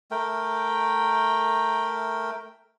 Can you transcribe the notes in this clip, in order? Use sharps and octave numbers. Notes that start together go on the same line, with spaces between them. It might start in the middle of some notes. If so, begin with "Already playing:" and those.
A3 A#4 G5